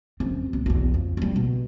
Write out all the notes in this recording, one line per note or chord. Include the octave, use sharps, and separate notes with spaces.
F#2 C4
B1
B1 E2
F2
C2 G3
B2